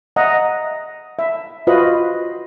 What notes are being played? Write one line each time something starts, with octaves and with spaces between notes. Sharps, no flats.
D#5 E5 F#5 A#5
E5
F4 F#4 B4 C5 D#5 B5